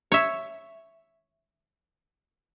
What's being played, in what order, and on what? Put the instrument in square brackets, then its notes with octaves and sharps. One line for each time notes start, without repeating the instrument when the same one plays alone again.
[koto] C#5 E5